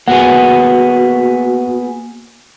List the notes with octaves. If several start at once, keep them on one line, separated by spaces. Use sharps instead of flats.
A#3 B3 F#4 G#4 F#5